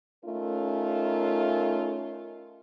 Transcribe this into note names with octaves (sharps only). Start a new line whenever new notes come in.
A3 C#4 D#4 F4 A#4